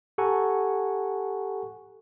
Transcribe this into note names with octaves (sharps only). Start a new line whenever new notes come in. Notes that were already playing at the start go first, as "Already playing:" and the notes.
G4 A4 F#5 G#5 A#5 C#6